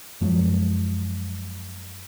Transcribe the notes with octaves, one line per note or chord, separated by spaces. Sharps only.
F#2 F3 F#3 G#3